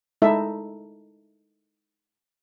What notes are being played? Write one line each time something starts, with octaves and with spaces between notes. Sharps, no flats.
G#3 D#4 E4 A4 E5